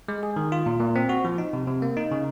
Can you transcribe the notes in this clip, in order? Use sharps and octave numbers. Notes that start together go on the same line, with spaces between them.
G#3
G#4
D#3
F4
A#2
A#2
C4
F#4
F3
D#4
C3
C3
A#3
D#4
C#3